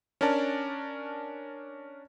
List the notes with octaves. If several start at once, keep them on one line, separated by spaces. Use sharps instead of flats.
C#4 D4 A#4 D5 A5